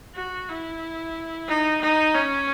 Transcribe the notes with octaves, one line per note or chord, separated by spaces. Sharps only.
F#4
E4
D#4
D#4
C#4